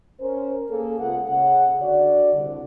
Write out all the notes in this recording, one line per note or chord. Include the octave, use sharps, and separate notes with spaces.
C#4 A#4 C5
A#3 G#4 A4
C#2 C#3 B3 F4 F#5
C#3 F#5
D3 F#4 D5
C2 D3